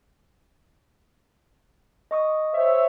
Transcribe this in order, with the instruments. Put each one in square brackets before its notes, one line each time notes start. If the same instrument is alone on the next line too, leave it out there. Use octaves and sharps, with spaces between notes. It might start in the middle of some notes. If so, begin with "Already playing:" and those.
[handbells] D#5 C#6 D#6
[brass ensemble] C5 C#5 E5